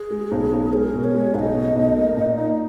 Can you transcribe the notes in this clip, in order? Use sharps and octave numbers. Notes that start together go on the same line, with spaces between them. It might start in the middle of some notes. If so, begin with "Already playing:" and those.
Already playing: G#4
G#3
B1
B1
G#3 A#4 C#5
B2
C#5
G#3
B1 D#5 F#5
B2
B1
A#3
A#2
D#4